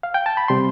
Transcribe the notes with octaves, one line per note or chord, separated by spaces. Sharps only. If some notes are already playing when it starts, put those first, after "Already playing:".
F5
G5
A5
B5
C3 G3 C6